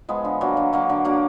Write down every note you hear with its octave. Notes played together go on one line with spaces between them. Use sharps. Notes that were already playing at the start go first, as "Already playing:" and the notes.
F3 G#3 B3
D3
F#3 A#3 D4
D3
F#3 A#3 D4
D3
F#3 A#3 D4